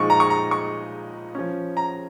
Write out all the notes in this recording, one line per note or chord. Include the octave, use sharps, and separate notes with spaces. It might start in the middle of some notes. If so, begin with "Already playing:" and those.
Already playing: A#2 F3 G#3 D#4 C#6
A#5
C#6
A#5
C#6
F3 C#4
A#5